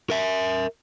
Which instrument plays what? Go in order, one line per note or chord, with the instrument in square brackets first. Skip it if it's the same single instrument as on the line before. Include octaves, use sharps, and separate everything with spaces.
[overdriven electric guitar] A#4 E5